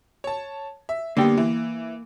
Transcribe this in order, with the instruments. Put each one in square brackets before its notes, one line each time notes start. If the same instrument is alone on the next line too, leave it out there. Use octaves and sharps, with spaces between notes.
[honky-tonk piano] C#5 A5
E5
[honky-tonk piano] D3 G3 B3 [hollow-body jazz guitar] A#3 G5
[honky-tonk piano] E3